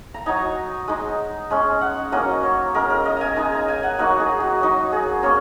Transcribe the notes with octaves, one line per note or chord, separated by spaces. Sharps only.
A#5
F#3 D#4 G#5
G#3 D#4
G#3 C#4
F#5
F#3 A#3 C#4 D#5
C#5
G#3 C#4 A#4
A#4
D#5
G#5 A#5
G#3 D#4 G#5
A#5
G#5
F#5
F#3 A#3 D#4 F#4
G#4
F#4
F#3 D#4
G#4
A#3 C#4 C#5